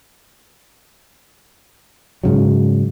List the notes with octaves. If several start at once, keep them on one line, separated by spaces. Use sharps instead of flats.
G#2 C#3 F#3